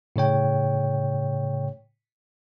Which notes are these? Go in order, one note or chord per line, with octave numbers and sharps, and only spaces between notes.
A2 C#3 C#5 G5